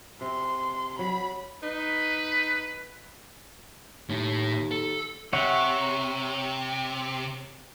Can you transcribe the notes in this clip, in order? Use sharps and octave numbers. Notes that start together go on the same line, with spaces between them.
C3 C6
F#3 B5
D#4 B4
D#2 A2
A4
C3 C#5 E5 F#5